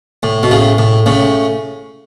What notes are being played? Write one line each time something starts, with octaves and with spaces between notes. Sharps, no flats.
A2
B2
A2 C#3
A2
A2 C#3